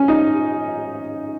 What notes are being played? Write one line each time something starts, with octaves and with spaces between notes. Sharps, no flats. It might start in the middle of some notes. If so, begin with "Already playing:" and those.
Already playing: C#4
D#4